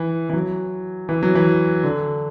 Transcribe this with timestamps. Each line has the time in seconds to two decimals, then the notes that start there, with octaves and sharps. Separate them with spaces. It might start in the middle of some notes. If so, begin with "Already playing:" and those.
Already playing: E3
0.29 E3
0.33 F#3
1.09 E3
1.23 F#3
1.35 E3
1.83 D3